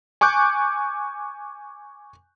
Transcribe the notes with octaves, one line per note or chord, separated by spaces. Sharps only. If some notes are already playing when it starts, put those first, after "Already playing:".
G#5 C#6 D6 F#6 G6